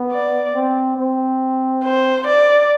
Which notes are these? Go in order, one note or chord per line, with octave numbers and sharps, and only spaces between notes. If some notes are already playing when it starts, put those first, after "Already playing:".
Already playing: B3
D5
C4
C4
C5
D5